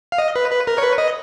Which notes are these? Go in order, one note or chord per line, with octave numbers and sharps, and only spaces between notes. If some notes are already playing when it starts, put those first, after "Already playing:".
F5
D#5
B4
B4
A#4
C#5
B4
D#5